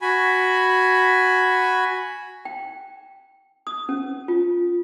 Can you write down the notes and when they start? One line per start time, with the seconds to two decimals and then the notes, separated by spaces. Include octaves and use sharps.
0.02 F#4 G#5 B5
2.45 G5
3.67 D#6
3.89 C#4
4.28 F4